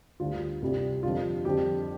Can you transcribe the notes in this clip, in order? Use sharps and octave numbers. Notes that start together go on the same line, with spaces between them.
D2 D3 G3 F4
C2 C3 G3
F2 D3 G3 F4
F2 D3 G3 G4